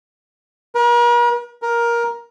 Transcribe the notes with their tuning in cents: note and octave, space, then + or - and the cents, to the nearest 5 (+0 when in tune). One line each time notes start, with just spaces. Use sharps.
A#4 +45
A#4 +15